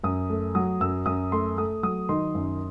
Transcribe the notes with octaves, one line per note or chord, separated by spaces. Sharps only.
F#2 D#6
A3
F#3 D#6
F#2 E6
F#2 D#6
A3 C6
A3 D#6
F#3 D#6
D#3 C6
F#2